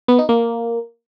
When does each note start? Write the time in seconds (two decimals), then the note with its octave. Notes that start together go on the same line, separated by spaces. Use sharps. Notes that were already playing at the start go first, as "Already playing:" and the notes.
0.08 B3
0.19 D#4
0.29 A#3